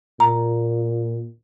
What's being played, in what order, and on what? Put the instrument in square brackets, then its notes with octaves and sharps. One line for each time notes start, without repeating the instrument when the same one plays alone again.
[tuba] A#2 [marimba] A#5